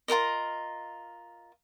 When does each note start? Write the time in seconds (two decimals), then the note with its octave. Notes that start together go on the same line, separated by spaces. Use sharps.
0.08 F4 A4 A#4 D#5